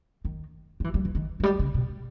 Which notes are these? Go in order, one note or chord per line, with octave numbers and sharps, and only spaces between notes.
D#3
G3
E3
G3
E3
D#3
E3
G3
C#3
B2